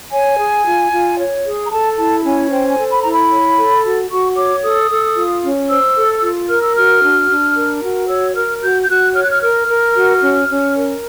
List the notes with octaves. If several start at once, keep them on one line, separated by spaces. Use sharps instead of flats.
C#5 G#5
G#4
F4
F4
C#5
G#4
A#5
A4 A5
E4 A5
C#4 G#5
C5 G5
G#5
A4
B5
E4 A#5
B5
C#5
A4
F#4
F#4 C#6
C#5 D6
A4 D#6
A4
F4
C#4
C5 E6
A4
F4
A#4 F6
E6
F#4 F6
D4
D4
A#4
F#4
C#5 E6
A#4 F6
F#4 G6
G6
F#4 F#6
C#5 F6
F#6
F6
A#4 F6
A#4
F#4
C#4
C#4
A#4